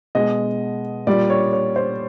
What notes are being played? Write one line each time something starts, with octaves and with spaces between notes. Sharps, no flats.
B2 G#3 D#5
A#2 G3 D5
C#5
C#5
C5